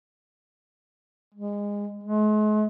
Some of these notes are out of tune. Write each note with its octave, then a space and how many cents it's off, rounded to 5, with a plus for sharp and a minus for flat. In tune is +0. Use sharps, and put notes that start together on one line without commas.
G#3 -25
G#3 +40